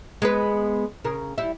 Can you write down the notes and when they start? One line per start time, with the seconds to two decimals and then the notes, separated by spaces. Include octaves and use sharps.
0.22 G#3 B3 B4
1.04 C#3 A#4
1.38 G3 E4